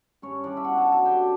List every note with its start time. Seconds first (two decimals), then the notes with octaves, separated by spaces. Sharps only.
0.22 G2 C#4 C#5
0.44 E3 G3 D4 D5
0.57 E5
0.64 B2 F#4 F#5
0.78 A4 A5
0.85 F#3
0.92 A4 A5
1.05 F#2 G4 G5